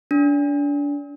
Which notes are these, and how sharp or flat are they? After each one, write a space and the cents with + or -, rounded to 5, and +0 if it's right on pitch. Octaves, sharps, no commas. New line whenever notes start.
D4 -30